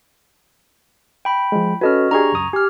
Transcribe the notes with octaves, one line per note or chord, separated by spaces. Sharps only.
G5 B5
F3 G#3
C#4 F#4 A4 B4 D#5 F6
D4 G4 G#4 A#5 C#6 G#6
C#2 F#2 D#6
G4 G#5 F6